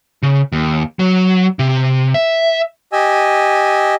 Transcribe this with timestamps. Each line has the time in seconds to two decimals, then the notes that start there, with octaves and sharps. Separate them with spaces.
0.23 C#3
0.52 D#2
0.99 F#3
1.59 C3
2.14 E5
2.92 G4 D#5 G#5 E6